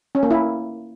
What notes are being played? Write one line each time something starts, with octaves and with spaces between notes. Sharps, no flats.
C#4
A#3
E4